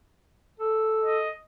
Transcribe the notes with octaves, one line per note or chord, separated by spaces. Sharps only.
A4
D#5